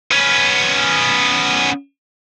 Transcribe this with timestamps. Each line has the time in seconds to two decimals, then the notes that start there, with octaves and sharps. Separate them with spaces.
0.11 B3 C#4